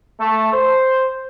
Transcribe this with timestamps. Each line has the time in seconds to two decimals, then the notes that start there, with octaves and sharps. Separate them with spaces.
0.20 A3
0.54 C5